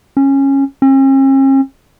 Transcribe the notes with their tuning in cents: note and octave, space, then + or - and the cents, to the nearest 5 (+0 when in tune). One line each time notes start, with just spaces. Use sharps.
C#4 -15
C#4 -45